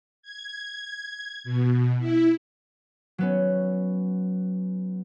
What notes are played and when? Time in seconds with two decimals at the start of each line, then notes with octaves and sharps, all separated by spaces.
0.22 G#6
1.44 B2
1.99 E4
3.18 F#3 B3 C#4